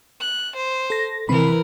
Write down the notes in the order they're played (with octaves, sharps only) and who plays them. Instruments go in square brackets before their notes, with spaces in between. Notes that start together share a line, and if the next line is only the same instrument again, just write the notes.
[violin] F#6
C5
[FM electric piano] A4 A#6
[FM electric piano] C3 C4 B5 [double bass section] E3 [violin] A#4 B4